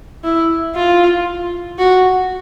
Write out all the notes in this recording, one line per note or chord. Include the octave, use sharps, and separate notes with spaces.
E4
F4
F#4